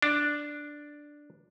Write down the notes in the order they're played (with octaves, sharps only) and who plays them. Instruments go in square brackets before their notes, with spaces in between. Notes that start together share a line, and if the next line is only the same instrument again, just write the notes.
[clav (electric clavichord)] D4